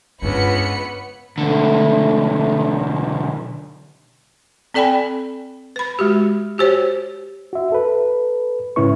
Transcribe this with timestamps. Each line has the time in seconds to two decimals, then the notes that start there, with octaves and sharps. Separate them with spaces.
0.22 C#2 G2 B3 F4 B5 C#7
1.38 B1 D3 A3
4.74 C4 A4 D5 G5 G#5 B5
5.76 B4 B5
5.99 G#3 F#4 G4
6.58 F#4 G4 C5 C#5
7.53 F#4 E5
7.72 A4 B4
8.76 G#2 C#3 C#4 E4 B4 C#6